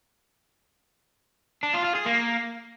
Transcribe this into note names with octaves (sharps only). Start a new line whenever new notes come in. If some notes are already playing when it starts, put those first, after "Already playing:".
D4
F4
F4
G#4
A#3